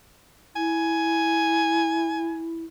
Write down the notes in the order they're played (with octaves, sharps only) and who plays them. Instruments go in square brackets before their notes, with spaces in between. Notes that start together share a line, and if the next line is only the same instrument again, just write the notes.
[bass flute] E4 [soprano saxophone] G#5